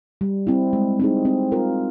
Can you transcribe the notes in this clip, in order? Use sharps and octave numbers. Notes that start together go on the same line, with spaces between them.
G3
C4 E4
G#3
C4 D#4 G#4
C4
F4 A#4